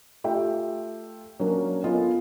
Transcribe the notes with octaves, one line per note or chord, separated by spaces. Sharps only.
A3 F4 G4 E5 G5
F#3 A#3 C#4 D4 A#4
B3 F4 A4 A#4 D#5 G#5